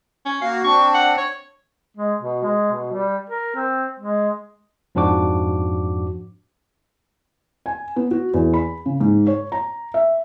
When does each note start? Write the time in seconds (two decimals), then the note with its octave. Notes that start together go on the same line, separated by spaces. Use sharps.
0.26 C#4
0.42 A#3 F#4 F5
0.64 C4 D4 C#6
0.94 F#5
1.17 C#5
1.97 G#3
2.22 B2
2.43 G#3
2.72 B2
2.92 G3
3.29 A#4
3.56 C4
3.99 G#3
4.95 F2 G#2 F3 D4 F#4 D6
7.66 G#5
7.96 B3
8.11 F#4
8.34 E2
8.54 B5
8.86 C#3
9.00 G#2
9.27 C#5
9.52 A#5
9.94 E5